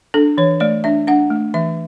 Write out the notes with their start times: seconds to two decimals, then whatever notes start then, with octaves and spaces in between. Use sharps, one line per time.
0.14 D4 A4
0.38 E3 C#5
0.60 A3 D5
0.84 D4 E5
1.07 D4 F#5
1.30 A3
1.54 E3 E5